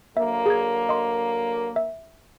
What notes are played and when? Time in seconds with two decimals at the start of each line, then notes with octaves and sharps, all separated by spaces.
0.17 D3 F#3 A#3 E5
0.46 G#4 G#6
0.89 D#5 C6
1.76 E5